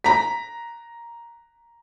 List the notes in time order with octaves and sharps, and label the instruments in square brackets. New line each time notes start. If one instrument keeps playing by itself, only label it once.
[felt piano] A#5 B6